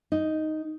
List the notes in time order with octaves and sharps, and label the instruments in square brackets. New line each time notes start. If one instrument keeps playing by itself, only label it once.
[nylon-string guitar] D#4